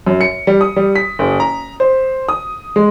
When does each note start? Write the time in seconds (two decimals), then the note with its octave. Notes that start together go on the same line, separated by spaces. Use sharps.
0.07 F#2
0.21 C#7
0.47 G3
0.61 D#6
0.76 G3
0.96 B6
1.19 F#1
1.40 A#5
1.80 C5
2.29 D#6
2.76 G#3